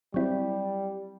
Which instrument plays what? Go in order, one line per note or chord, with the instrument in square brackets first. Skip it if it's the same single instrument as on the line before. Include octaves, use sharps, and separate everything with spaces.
[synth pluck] F#3 C4 E4 [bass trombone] G3